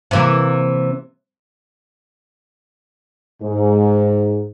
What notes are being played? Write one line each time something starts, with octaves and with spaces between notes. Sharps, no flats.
C3 E3 A#3
G#2